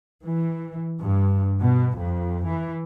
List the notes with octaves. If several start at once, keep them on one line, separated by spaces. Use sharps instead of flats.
E3
G2
B2
F2
E3